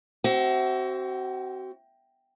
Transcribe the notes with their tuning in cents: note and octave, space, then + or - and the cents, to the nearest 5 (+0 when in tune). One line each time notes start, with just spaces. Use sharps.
C4 +0 F#4 +30 E5 +0